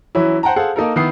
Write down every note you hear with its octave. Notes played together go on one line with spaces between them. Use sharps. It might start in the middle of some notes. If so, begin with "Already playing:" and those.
E3 F#3 C#4 E4
C5 F#5 G5 A5 A#5
G#4 A4 C5 F5 F#5
A#3 D#4 A4 A#4
D#3 B3 E4 D#6 C7